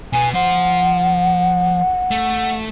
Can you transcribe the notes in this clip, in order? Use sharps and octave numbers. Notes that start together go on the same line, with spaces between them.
B2 B3 G#5
F3 C5 F#5
A3